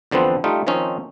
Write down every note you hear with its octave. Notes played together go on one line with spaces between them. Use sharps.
E2 D3 F3 B3 C4
G3 A3 D#4 F4
D#3 F3 C4 C#4 D#4